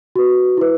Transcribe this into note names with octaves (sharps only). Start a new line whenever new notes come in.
F#4 B4
E4 B4